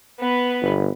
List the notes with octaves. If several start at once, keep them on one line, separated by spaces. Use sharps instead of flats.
B3 B4
G1